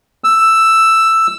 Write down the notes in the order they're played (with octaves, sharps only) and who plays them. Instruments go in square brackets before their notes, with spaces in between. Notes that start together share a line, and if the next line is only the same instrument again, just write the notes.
[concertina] E6